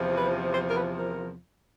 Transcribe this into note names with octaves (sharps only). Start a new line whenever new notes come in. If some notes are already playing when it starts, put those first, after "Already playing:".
Already playing: E2 C3 F3
B4
C5
A#4
B4
A#4